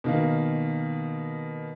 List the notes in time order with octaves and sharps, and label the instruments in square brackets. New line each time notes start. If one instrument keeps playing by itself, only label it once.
[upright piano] B2 D#3 A#3